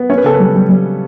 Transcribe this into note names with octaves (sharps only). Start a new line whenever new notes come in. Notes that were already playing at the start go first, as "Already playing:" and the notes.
Already playing: B3
C#4 C#5
B4
C#3 A4
B4
G3
G3
G3